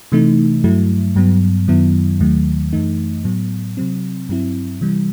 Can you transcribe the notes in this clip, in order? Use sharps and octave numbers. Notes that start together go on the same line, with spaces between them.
C3 E3 A3 D#4
G2 F#3 A3 E4
G2 F#3 B3
F#2 D#3 F#3 B3 E4
D#2 D#3 F#3 A3
F#2 E3 A3 D#4
A2 F#3 B3
C3 F#3 C4
G2 F#3 C4 E4
C3 E3 G3